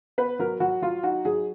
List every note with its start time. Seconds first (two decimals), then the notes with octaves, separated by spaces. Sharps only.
0.18 B3 B4
0.39 F#3 A#4
0.60 F#3 F#4
0.82 F#3 F4
1.03 D#4 F#4
1.25 F#3 G#4